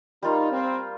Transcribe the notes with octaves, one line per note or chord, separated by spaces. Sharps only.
G3 A#3 D#4 F4
C4